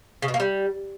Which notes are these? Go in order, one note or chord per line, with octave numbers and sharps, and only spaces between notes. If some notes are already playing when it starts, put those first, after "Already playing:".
C#3
B2
A#3
G3